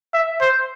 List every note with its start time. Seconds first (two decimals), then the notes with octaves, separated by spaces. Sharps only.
0.14 E5
0.41 C5